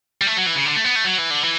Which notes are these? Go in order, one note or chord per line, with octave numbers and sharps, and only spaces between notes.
G3
A3
F#3
E3
C#3
D3
A3
B3
A3
F#3
E3
D3
E3